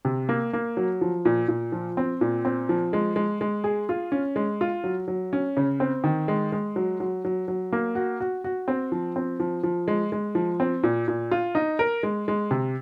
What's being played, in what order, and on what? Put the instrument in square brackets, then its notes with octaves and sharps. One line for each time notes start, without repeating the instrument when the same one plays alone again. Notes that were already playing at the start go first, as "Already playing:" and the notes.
[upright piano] C3
A#3
A#3
F#3
F3
A#2
A#2
F3
C4
A#2
C4
F3
G#3
G#3
G#3
G#4
F4
C#4
G#3
F4
F#3
F#3
C#4
C#3
C4
D#3
G#3
G#3
F#3
F#3
F#3
F#3
A#3
F#4
F#4
F#4
C4
F3
C4
F3
F3
G#3
G#3
F3
C4
A#2
A#2
F4
D#4
A#4
G#3
G#3
C3